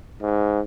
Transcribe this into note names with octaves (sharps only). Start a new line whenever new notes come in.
G#2